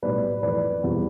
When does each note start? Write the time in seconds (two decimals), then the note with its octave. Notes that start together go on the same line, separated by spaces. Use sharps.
0.02 B1 A2 G3 B4 D5
0.42 F2 E3 A3 B4 D5
0.83 E1 E2 C3 G3